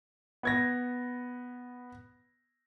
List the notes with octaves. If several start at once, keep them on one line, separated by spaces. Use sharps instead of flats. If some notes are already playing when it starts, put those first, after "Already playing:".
B3 G#6 A#6